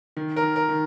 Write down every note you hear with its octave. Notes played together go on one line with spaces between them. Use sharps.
D#3
A#4
D#3
A#4
D#3